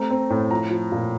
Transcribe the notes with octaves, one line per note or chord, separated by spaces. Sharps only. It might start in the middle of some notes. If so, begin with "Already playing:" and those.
Already playing: A3 C4 A#5
C4
A2
F3 A#5
F3
A#2